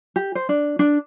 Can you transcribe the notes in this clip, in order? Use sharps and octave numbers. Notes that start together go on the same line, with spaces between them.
G4
C5
D4
D4